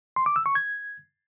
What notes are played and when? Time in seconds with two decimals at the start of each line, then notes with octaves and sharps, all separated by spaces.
0.16 C6
0.26 D6
0.36 E6
0.46 C#6
0.55 G#6